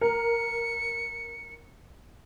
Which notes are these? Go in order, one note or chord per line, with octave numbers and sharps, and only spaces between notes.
A#4 C#7